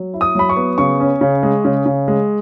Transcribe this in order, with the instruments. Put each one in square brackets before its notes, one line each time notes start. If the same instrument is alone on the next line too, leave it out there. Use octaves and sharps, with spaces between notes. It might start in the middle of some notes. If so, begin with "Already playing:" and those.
Already playing: [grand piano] F#3
E4
D#6
F#3 B5
C#6
B3
C#3 C#6
C#4
C#3
G#3
C#3
C#3
G#3